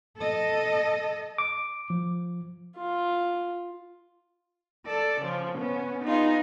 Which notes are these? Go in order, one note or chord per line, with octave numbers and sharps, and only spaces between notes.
A4 D#5
D6
F3
F4
A4 D5
C#3 F3
B3 C#4
B3 D#4 F4 G#4